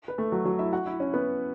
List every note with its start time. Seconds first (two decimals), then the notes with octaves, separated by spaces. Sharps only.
0.08 B4
0.18 A3 A4
0.32 F#3 F#4
0.45 F#3 F#4
0.59 E4 E5
0.73 F#4 F#5
0.86 E4 E5
1.00 C#4 C#5
1.14 B3 B4